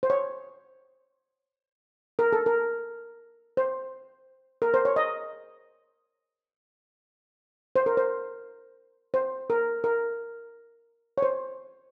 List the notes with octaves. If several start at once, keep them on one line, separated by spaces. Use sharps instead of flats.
C5
C#5
A#4
A4
A#4
C5
A#4
C5
C#5
D#5
C5
A#4
C5
C5
A#4
A#4
C#5
C5